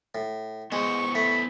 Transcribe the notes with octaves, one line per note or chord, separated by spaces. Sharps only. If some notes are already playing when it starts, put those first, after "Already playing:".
A2
G#3 B3 E4 C5 C#6
A3 B5